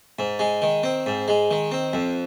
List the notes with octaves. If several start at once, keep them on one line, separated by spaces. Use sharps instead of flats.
G#2
G#3
D#3
C4
G#2
G#3
D#3
C4
F2